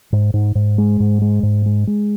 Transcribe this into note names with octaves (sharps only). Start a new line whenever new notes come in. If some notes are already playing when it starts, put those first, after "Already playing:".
G#2
G#2
G#2
G#3
G#2
G#3
G#2
G#3
G#3